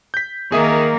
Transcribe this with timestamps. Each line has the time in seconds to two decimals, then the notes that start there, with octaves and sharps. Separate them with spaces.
0.14 G6 B6
0.52 D#3 A#3 G#4 E5 D#6